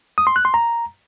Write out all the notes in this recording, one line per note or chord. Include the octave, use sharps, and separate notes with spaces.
D#6
C6
F#6
C6
A#5